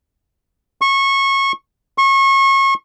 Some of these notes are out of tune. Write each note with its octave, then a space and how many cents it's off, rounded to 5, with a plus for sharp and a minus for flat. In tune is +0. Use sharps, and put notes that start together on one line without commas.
C#6 -20
C#6 -30